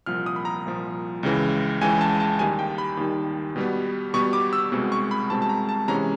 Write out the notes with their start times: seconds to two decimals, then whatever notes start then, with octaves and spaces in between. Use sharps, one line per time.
0.06 C2 A#2 F3 F6
0.26 D#6
0.36 B5
0.45 A#5
0.65 C2 A#2 F3
1.23 C#2 C#3 E3
1.81 C#2 C#3 E3 G#5
2.01 A5
2.20 A5
2.39 D#2 D#3 G3 G#5
2.59 G5
2.78 B5
2.97 D#2 D#3 G3
3.56 B2 G3 B3
4.14 B2 G3 B3 C#6
4.33 D6
4.53 E6
4.72 C2 B2 G#3 C4
4.92 C#6
5.11 B5
5.30 C2 B2 G#3 C4 A5
5.42 A5
5.49 A#5
5.69 A5
5.88 C3 E3 G#3 C#4 A#5